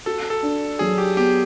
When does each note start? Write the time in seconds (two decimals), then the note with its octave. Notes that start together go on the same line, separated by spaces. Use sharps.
0.06 F#4 A4
0.30 A4
0.43 D4
0.79 F#3 G#4
0.98 G4
1.17 B3 G4